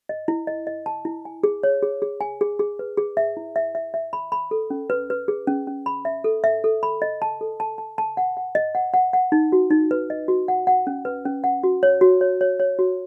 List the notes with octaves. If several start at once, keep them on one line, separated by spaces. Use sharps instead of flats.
D#5
E4
D#5
D#5
A5
E4
G#5
G#4
C#5
G#4
G#4
G#5
G#4
G#4
B4
G#4
E5
E4
E5
E5
E5
B5
B5
A4
C#4
B4
B4
G#4
C#4
C#4
B5
E5
A4
E5
A4
B5
D#5
A5
A4
A5
A5
A5
F#5
F#5
D#5
F#5
F#5
F#5
D#4
F#4
D#4
B4
D#5
F#4
F#5
F#5
C#4
B4
C#4
F#5
F#4
C#5
F#4
C#5
C#5
C#5
F#4